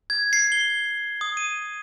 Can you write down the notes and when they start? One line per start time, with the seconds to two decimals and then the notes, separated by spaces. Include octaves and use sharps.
0.10 G#6
0.33 C7
0.52 G7
1.21 D#6
1.37 D#7